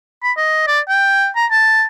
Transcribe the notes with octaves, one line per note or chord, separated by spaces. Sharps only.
B5
D#5
D5
G5
A#5
A5